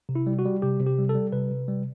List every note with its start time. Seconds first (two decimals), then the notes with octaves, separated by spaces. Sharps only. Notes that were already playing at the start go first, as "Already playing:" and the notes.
0.09 C3
0.15 E4
0.26 G3
0.39 F#4
0.45 G3
0.62 C3 G4
0.80 C3
0.86 G4
0.98 G3
1.09 A4
1.15 G3
1.32 C3 B4
1.51 C3
1.68 G3